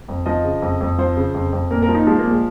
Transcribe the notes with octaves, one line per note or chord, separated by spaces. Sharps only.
F2
F3 D#5
C#3
F2
F2
F3 C5
C#3
F2
F2
A#2 A#4
A#4
F3
D#4
F3 G#3
A#3
A#2
G#3